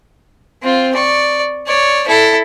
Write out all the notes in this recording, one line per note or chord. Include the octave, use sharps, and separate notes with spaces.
C4 F4
D5 C#6
C#5 D5
E4 A4